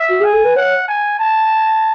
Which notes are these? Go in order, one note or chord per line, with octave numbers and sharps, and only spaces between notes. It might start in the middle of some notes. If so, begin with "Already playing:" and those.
Already playing: E5
F#4
G#4 G#5
A4
B4
C#5 F#5
G#5
A5